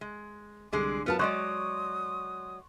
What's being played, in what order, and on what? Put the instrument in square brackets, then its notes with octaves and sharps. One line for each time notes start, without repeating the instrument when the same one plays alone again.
[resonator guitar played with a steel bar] G#3
[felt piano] C2 [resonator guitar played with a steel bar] D3 G#3 G#4 [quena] D6
[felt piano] F#3 A#4 B4 [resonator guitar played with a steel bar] B3 F4 A5 [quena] F6
[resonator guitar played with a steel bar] F#3 G#3 D5 [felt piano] C6 C#6 F#6 [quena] D#6